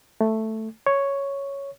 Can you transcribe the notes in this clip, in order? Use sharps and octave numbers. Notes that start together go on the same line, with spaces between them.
A3
C#5